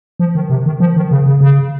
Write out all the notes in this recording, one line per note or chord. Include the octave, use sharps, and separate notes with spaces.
F3
D#3
C3
D#3
F3
D#3
C#3
C#3
C#3